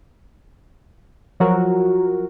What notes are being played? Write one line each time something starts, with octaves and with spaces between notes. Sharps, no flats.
F3 F#3 F#4 A#4